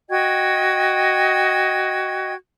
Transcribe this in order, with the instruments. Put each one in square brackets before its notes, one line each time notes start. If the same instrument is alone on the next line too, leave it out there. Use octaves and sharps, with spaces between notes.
[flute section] F#4 D#5 G5 G#6